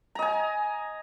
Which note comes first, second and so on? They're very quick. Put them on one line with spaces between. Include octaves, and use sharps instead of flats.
A#5 D#5 G#5